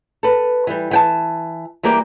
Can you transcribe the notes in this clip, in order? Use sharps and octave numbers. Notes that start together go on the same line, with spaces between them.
A4 B4
E3 G3
E3 G5 A5
E3 G3 A#3 G4 D5